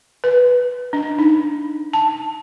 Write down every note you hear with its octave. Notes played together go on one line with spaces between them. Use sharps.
B4
D4
D#4
A5